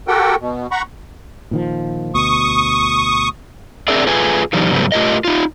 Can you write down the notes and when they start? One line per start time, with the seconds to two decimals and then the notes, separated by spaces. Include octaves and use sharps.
0.08 F#4 G4 A4 A#4 F#5 G5
0.40 B2
0.71 F#5 A#5 B5 C#6
1.51 A#2 D#3 F3
2.15 D2 B2 C#6 D#6
3.88 C4 D4 G#4 A#4 D5 E5
4.07 A3 F4 G#4 B4 G#5
4.53 B2 D#3 F3 G3
4.72 G#2 C#3 F#3 G3 A3 B3
4.92 A3 F4 G4 A#4 D#5
5.25 D#4 F4